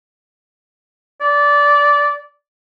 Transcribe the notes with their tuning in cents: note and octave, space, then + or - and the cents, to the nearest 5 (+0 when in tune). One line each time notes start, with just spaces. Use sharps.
D5 -15